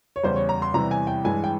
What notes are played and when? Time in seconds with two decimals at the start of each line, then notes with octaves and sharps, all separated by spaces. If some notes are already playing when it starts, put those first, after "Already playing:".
0.16 C#5
0.23 E2 C#3 G3 C5
0.36 C#5
0.49 A#5
0.62 C6
0.74 E2 C3 E3 G3 A#5
0.91 G#5
1.07 G5
1.24 G2 E3 G#3 G#5
1.44 G5